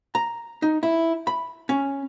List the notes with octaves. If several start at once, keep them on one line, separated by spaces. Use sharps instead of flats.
A#5
D#4
E4
B5
C#4